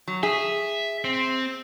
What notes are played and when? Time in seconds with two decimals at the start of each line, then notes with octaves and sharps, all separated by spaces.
0.08 F#3
0.23 G#4 E5
1.04 C4